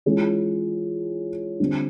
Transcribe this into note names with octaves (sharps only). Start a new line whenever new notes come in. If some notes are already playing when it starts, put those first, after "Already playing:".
E3 G#3 C#4 F4
D3 G3 C4